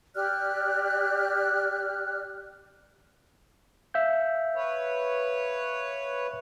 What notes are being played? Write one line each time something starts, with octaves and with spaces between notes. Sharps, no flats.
G4 D5 F6 F#6
E5 F5 G6
B4 C#5